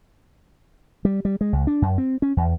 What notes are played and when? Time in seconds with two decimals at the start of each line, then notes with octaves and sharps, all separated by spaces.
1.05 G3
1.25 G3
1.41 G#3
1.53 C#2
1.67 D4
1.82 F#2
1.98 C4
2.22 C#4
2.37 E2